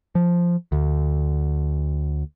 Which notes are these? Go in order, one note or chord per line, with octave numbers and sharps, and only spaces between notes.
F3
D2